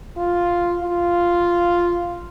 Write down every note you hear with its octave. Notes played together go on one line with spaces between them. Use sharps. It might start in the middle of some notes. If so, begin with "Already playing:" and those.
F4
F4